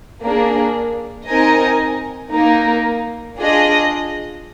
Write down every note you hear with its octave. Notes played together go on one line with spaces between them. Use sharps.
A#3 D4 G#4
C4 D#4 A#4 D#5 G#5
A#3 D#4 A#4
D4 F4 G#4 D#5